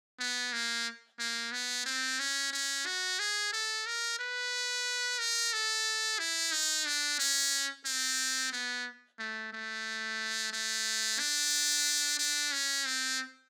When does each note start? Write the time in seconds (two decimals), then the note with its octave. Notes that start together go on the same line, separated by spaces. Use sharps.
0.20 B3
0.53 A#3
1.19 A#3
1.52 B3
1.86 C4
2.19 C#4
2.53 C#4
2.86 F#4
3.19 G#4
3.53 A4
3.86 A#4
4.19 B4
5.19 A#4
5.53 A4
6.19 E4
6.52 D#4
6.86 D4
7.19 C#4
7.86 C4
8.53 B3
9.19 A3
9.53 A3
10.53 A3
11.19 D4
12.19 D4
12.52 C#4
12.86 C4